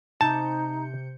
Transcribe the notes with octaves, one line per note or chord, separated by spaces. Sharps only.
C3 D#4 A5 G6 C#7